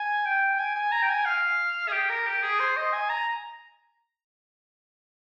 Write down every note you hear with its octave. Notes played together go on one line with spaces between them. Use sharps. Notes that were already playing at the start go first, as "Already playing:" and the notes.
Already playing: G#5
G5
G#5
G#5
A#5
G5
G#5
F5
G#4
G4
A#4
G4
G#4
C5
D#5
G#5
A#5